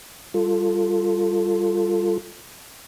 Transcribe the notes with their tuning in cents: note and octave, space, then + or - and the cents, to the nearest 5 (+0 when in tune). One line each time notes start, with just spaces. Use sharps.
G3 +0 F4 +0 A4 +10